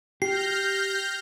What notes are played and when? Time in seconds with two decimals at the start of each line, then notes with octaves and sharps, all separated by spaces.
0.22 G4 F6 G6 A#6 C7